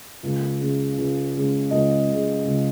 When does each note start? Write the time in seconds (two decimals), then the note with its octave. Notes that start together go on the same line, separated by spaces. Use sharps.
0.23 C#2
0.60 C#3 G#3
0.98 C#2
1.35 C#3 G#3
1.71 C#2 D#5
2.09 C#3 G#3
2.45 C#2